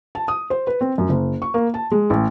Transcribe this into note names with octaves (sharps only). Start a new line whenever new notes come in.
A5
D#6
C5
B4
C4
F#2
F#1
C#6
A#3
A5
G#3
A1